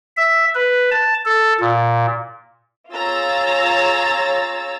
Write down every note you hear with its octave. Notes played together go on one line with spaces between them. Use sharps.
E5
B4
A5
A4
A#2
F4 G#4 C#5 A#5 E6 A6